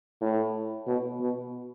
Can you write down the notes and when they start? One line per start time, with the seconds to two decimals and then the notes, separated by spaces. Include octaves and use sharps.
0.21 A2
0.87 B2
1.20 B2